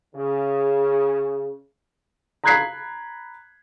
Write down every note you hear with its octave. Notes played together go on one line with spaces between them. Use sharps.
C#3
A#5 B5 F#6 G#6 B6 C7